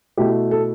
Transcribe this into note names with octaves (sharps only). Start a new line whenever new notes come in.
B2 A3 E4 G4
A4